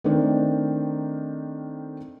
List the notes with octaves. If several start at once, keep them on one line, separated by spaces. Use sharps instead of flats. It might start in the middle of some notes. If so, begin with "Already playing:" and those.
D#3 A3 C4 D4 A#4